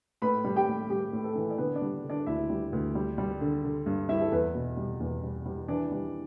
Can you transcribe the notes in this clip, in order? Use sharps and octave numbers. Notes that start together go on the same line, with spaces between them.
A2 B4 B5
G3
G4 G5
A2
G3 G4
A2
A4
E3
D5
D3 B3 B4
D4 D5
G3
D3
D4 D5
D2 E4 E5
G3
D2
G3
G3
D3
D3
G2
G3 E4 E5
A4
E2 B3 B4
B2
G3
E2
G3
G3
E3 D4 D5
G3